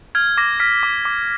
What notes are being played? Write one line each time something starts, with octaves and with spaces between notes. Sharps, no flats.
F6 G#6
D6 A#6
F6 B6
D6
D6